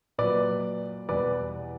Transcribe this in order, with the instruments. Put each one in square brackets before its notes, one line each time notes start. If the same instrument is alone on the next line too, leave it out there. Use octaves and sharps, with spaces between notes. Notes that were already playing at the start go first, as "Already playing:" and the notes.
[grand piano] A#2 F#3 B4 D5
E2 B2 G3 B4 D5